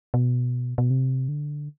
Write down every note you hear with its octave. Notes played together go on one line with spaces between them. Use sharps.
B2
B2
C3
D3